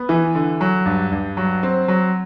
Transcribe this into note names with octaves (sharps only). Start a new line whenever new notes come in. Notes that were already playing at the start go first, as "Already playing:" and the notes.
Already playing: B3
E3
D3
F#3
G2
G2
F#3
C4
F#3